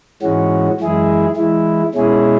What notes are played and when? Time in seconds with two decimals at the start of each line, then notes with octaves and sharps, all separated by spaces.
0.22 G#2 E3 G#3 C#4 F#4
0.80 F#2 E3 G#3 E4 G#4
1.36 E3 G#3 E4
1.94 B2 G#3 C#4 E4 G#4